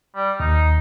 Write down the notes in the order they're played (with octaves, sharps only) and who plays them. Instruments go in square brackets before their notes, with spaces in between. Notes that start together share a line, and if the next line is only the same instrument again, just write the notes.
[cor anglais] G3
[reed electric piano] D#2 [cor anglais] D#4